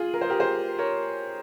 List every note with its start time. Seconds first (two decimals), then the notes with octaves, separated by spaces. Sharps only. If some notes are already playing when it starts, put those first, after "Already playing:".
Already playing: F4 G#4
0.14 A#4
0.21 C5
0.30 G4 A#4
0.40 G#4 C5
0.79 A#4 C#5